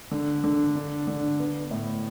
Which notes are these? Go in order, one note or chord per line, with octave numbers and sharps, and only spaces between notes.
D3
D3
D4
D3
B3
A2